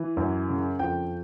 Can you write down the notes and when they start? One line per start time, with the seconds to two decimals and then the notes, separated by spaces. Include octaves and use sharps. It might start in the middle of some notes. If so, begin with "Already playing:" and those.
Already playing: E3
0.17 F#2
0.49 C#3
0.79 F2 G5